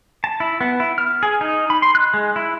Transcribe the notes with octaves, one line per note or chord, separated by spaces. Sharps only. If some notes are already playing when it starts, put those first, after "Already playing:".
A5
E4
B3
E4
F6
G#4
D#4
B5
C6
F#6
G#3
E4